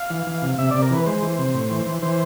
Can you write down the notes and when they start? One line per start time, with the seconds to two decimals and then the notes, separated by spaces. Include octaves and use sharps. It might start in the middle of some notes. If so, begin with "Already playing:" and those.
Already playing: F5
0.10 E3
0.27 E3
0.42 C3
0.58 C3 E5
0.71 C3 D5
0.82 A#4
0.91 E3 B4
1.06 G#3 C5
1.22 E3
1.38 C3
1.54 A2
1.71 E3
1.87 E3
2.02 E3 C5